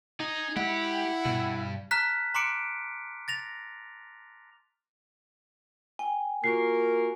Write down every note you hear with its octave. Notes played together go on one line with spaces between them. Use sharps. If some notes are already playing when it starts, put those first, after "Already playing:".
D#4 G#4
G#3 E4 G4 F#5
G2 B2
A5 A#5 F6 F#6 B6
A#5 C6 D6 F#6 C#7 D7
A6 A#6 F7
G5 G#5
A#3 F4 F#4 A#4 C#6 C7